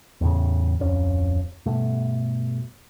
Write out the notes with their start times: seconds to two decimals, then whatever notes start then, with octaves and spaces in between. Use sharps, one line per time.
0.21 E2 A2 C#3
0.79 D1 F2 C#4
1.66 G2 B2 A3